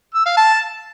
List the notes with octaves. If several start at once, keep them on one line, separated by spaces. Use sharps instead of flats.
E6
F5
A5